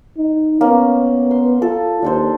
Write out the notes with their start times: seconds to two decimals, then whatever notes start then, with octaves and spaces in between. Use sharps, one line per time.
0.17 D#4
0.61 A#3 B3 C#4
1.31 C6
1.62 F4 A4
2.02 D#2 D4 A4 C5